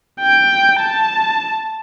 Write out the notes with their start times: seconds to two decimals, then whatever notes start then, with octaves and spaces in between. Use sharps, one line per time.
0.20 G5
0.80 A5